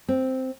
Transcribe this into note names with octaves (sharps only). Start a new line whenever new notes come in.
C4